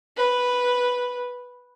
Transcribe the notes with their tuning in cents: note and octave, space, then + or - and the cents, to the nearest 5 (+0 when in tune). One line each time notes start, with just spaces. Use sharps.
B4 -5